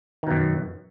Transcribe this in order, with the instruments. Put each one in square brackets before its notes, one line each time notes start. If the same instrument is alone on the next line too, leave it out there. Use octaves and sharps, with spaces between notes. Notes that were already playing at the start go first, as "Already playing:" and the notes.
[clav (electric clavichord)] D#3
B2
F#2